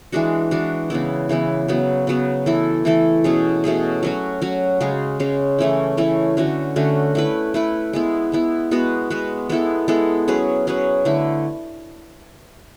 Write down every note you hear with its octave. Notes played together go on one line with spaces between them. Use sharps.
E3 G#3 D4 F#4
E3 G#3 D4 F#4
C#3 E3 B3 E4
C#3 E3 B3 E4
C#3 F#3 B3
C#3 F#3 B3
E3 A3 E4 A4
E3 A3 E4 A4
B2 A3 C#4 G#4
B2 A3 C#4 G#4
F#3 C#4 F#4
F#3 C#4 F#4
C#3 G#3 C#4
C#3 G#3 C#4
E3 A3 C#4 E4
E3 A3 C#4 E4
D3 A3 C#4 F#4
D3 A3 C#4 F#4
A3 E4 B4
A3 E4 B4
G#3 B3 E4
G#3 B3 E4
G#3 B3 F#4 B4
G#3 B3 F#4 B4
G#3 B3 E4 A4
G#3 B3 E4 A4
F#3 C#4 G#4 B4
F#3 C#4 G#4 B4
D3 A3 E4